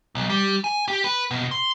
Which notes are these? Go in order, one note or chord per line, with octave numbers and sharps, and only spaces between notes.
B1
G3
G#5
G4
B4
B2
C6